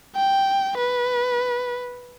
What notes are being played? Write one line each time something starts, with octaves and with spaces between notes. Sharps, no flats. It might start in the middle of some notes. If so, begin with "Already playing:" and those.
G5
B4